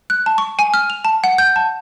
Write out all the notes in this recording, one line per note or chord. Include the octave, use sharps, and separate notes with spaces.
F#6
A5
C#6
G#5
F6
F7
A5
F#5
G6
A5